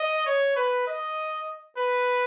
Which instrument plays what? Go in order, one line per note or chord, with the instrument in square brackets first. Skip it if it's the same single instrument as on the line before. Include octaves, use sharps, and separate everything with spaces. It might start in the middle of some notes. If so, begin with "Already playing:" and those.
Already playing: [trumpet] D#5
C#5
B4
D#5
B4